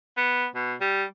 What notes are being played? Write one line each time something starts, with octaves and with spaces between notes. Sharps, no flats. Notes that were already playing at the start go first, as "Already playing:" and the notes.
B3
B2
G3